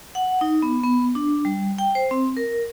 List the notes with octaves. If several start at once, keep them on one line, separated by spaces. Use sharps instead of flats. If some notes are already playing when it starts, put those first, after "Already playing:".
F#5
D#4
B3
B3
D4
G3
G5
C5
C4
A#4